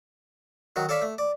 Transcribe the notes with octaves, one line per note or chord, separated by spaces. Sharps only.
D#3 F#3 F#4
A4 C#5 D5 F5 A5 B5
A3
D5